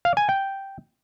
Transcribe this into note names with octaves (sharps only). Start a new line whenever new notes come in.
F5
G#5
G5